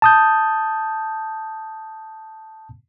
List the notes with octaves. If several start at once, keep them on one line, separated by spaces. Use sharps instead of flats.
A5 D#6 G6